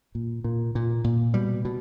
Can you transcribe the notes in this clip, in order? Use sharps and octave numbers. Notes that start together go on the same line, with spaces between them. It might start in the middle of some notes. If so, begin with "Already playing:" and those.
A#2
A#2
A#2
A#2
B2 G3
B2